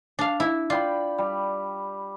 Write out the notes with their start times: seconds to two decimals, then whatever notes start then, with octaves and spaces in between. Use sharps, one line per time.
0.19 D4 F5
0.40 E4
0.70 F4 D5 G5 B5
1.18 G3